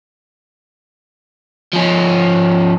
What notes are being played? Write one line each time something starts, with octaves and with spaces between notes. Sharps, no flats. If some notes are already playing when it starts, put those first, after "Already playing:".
F3 C#4